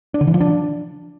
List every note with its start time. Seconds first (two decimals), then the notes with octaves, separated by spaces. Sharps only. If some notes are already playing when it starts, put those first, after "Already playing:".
0.14 D4
0.21 D3
0.27 E3
0.34 F3
0.41 D4